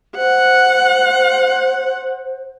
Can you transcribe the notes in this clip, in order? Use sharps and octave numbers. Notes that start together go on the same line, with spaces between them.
C5 F#5